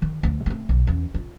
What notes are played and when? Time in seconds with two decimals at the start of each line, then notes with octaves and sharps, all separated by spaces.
0.02 D#3
0.23 D2
0.46 A3 C4
0.69 B1
0.87 E2 C#4
1.14 F4